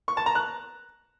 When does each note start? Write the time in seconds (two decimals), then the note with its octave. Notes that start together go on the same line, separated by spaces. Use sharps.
0.08 C#6
0.17 A5
0.26 A#5
0.35 F#6